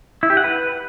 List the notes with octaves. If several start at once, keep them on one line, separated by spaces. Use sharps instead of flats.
E4
G4
F#5
B4